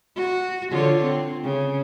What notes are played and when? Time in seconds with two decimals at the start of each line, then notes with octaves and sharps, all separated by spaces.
0.16 F#4
0.70 D3 F4 C#5
1.02 C4
1.43 C#3